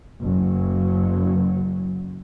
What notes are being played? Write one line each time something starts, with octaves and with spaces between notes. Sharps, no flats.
F#1 F#3